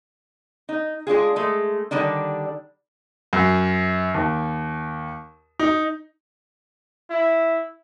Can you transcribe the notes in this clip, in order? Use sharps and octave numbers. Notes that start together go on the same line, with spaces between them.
D#4
G#3 D4 F4 G#4
G#3 A3
D3 D#3 G3 D4
F#2
D#2
D#4
E4